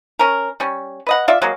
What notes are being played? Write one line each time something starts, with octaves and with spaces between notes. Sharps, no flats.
C#4 A#4
G3 C#4
B4 D#5 F#5
F4 D5 E5
F#3 G#3 A#3